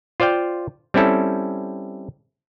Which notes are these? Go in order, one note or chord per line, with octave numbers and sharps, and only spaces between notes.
F4 C5 D5 F5 G5
G3 C4 C#4 E4 A4